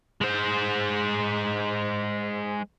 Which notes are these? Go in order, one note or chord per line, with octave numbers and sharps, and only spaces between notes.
G#3 C5